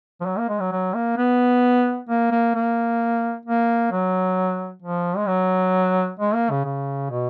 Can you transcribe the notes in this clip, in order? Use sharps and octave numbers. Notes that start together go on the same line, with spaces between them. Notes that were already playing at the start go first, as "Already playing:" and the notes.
F3
F#3
A#3
G#3
F#3
F#3
A#3
B3
A#3
A#3
A#3
A#3
F#3
F3
G#3
F#3
G#3
A#3
C#3
C#3
B2